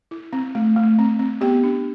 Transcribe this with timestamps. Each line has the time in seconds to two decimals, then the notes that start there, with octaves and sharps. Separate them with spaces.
0.11 E4
0.33 C4
0.55 A3
0.76 A3
0.99 C4
1.19 C4
1.41 B3 G4 G5
1.63 D4